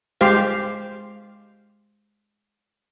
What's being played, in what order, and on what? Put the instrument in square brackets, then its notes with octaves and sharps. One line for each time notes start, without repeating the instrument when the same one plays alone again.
[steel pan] G#3 G4 C5 F5